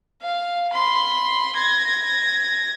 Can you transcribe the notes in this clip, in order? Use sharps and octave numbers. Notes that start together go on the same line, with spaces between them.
F5
B5 C6
G#6 A#6